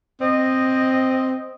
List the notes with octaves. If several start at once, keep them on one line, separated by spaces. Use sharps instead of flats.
C4 D#5